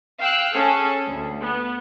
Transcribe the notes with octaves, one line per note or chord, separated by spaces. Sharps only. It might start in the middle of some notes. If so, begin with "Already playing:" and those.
F5 G5 E6 F#6
C#4 G#4 A4
D2
B3